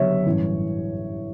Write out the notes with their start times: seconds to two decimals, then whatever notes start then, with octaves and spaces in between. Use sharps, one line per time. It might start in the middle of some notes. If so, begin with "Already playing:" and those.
Already playing: F#1 F#2 D3 G3 B3 C#5 E5
0.26 A1 G2 E3